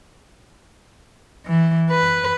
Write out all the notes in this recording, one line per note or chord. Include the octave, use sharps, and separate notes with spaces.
E3
B4